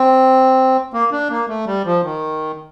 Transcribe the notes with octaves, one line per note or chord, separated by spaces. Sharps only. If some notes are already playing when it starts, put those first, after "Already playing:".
Already playing: C4
A#3
D4
A#3
A3
G3
F3
D#3